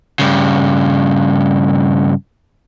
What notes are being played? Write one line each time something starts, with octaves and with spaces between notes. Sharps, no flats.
G2 C#3